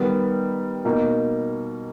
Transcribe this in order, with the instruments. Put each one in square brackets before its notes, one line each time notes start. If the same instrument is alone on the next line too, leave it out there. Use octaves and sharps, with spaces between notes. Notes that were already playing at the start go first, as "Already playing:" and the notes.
Already playing: [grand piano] D#3 G3 B3
B2 A#3 D#4